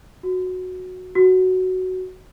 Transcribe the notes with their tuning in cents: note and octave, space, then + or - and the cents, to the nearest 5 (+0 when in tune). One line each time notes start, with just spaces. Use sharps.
F#4 -10
F#4 +5